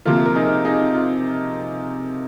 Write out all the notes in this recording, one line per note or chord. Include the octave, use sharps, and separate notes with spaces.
C3 F3 A#3 F4
A#4
D#4 G#4
D#4 G#4
F4